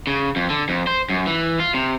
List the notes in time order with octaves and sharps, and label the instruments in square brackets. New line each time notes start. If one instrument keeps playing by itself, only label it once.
[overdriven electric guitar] C#3
F2
D3
F2
C5
F#2
E3
F4
C3